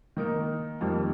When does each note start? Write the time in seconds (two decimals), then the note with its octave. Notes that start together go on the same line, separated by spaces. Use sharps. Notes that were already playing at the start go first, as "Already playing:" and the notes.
0.17 D#3 A#3 D#4 A#4
0.81 F2 D#3 G3 A#3